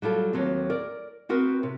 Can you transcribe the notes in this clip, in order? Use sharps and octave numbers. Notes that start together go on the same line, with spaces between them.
F#3 G3 F4 A4
D#2 F#3 B3 C4
A#4 D5
B3 C4 F#4 A#4 B4
C3